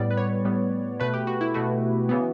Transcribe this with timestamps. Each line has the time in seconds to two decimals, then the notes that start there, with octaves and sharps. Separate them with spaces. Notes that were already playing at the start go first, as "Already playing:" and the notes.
Already playing: A2 G3 B3 D5
0.11 B4
0.17 C#5
0.45 A2 G3 B3
1.00 B2 A3 B4
1.14 G4
1.27 F#4
1.41 E4
1.54 B2 A3 F#4
2.09 C#3 E3 B3